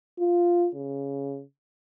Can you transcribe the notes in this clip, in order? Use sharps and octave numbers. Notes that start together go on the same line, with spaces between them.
F4
C#3